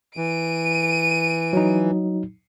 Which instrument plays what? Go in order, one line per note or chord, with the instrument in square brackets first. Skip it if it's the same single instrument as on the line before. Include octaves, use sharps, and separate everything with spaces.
[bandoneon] E3 [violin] D7 D#7
[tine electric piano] F#3 D#4